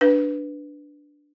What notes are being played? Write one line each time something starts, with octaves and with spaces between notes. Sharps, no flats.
D4 B4